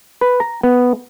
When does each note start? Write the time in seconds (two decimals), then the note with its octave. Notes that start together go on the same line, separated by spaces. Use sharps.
0.21 B4
0.40 A#5
0.63 B3